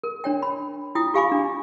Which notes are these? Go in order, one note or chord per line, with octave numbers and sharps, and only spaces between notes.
A#4
D4 C#5 G5
B5
E4 F4 G5 D#6
F4 G4 F5 G#5 B5 D6
D4